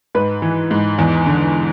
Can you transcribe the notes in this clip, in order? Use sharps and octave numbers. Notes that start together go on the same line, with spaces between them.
G#2 B4
E3
G#2
E2
D3